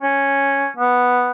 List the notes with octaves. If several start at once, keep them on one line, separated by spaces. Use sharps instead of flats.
C#4
B3